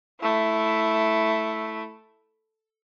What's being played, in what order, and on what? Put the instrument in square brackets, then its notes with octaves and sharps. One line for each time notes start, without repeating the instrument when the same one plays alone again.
[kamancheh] A3 E4